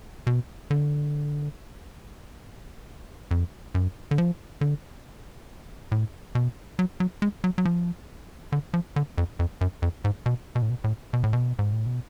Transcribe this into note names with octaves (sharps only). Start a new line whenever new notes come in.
B2
D3
F2
F#2
D3
F3
D3
A2
B2
F#3
F#3
G#3
F#3
F#3
F3
D3
F3
D3
F2
F2
F#2
F2
G#2
B2
B2
A2
B2
A2
B2
A2
B2
G#2
A2
B2